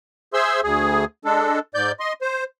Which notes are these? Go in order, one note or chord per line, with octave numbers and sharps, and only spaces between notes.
G#4 C5 E5 C6 E6
D2 G#4
G#3 D4 A4
G#2 D5 G6
D#5 C6
C5